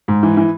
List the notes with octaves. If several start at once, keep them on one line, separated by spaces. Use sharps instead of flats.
G#2
E3
E3